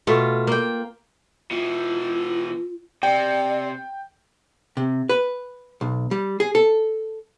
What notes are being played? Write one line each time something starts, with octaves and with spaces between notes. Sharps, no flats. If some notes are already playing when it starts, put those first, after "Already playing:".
B2 A3 F4
A#3 G5
B2 E3 F4
C3 D5 G5
C3
B4
B1
G3
G#4
A4